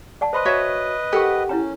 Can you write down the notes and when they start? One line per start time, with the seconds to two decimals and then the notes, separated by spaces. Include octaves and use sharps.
0.21 D5 F#5 A5
0.33 B4 C5 D#5 B5 C6
0.45 F#4 C#5 E5
1.13 G4 A4 A#4 F#5 C#6
1.49 C#4 E4 C#5 A#5